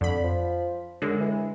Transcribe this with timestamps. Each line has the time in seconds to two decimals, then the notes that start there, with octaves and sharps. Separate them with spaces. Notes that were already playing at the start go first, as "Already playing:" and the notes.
0.01 F2 D3 B5
0.24 F3
1.02 F#2 D3 G#3
1.21 E3